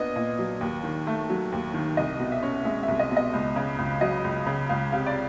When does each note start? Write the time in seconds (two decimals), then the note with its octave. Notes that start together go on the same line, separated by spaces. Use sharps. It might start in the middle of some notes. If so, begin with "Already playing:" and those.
Already playing: A#2 B3 D4 D#5
0.16 A#2
0.39 F#3
0.61 D#2
0.84 D#3
1.07 A3
1.30 F#3
1.52 D#2
1.74 D#3
1.97 C2 D#5
2.20 B2
2.32 E5
2.42 C#4
2.65 G#3 E5
2.83 E5
2.88 C2
2.99 D#5
3.11 B2
3.17 D#5
3.34 C#2
3.56 C#3
3.79 C#2
4.01 F#3 D#5
4.24 C#2
4.46 C#3
4.69 C#2 F5
4.92 C3 F5
5.06 D5